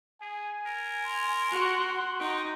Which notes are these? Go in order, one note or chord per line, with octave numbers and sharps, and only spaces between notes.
G#4 G#5
A#4
C6
F#4
F#5
D#4 G5